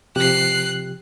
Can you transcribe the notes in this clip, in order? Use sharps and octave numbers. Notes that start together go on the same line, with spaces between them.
C3 F3 G4 F#6 C7